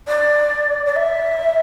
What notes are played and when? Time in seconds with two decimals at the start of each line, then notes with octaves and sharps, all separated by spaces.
0.08 D5
0.86 D5
0.96 E5